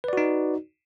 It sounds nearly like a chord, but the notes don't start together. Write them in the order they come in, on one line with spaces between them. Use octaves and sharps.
B4 D5 F#4 D#4